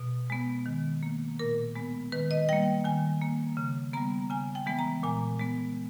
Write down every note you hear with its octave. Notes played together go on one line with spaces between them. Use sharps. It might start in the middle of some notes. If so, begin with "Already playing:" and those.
Already playing: B2
G#3 B3
D#3
A#3
A#2 A#4
G#3 B3
D#3 B4
D#5
G3 A#3 G5
D#3 G#5
A#3
C#3
G3 B3 A#5
C#3 G#5
G5
E3 G#3 B3
A#5
A#2 G#5
G#3 B3